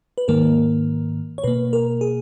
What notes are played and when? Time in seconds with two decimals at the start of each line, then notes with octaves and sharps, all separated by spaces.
0.18 B4
0.28 G#2 D#3 A#3 A#4
1.38 C#5
1.44 B2 A#3 B4
1.73 A#4
2.01 G#4